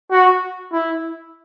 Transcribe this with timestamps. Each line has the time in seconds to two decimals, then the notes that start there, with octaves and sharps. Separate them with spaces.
0.11 F#4
0.73 E4